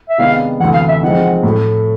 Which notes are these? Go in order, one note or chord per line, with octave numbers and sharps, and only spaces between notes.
E5
C3 D#3 G#3 B3 D4 F5
D2 C3 E3 F#5
F5
E5
F3 G#3 C4 D#4 F#5
A2 F#3 A3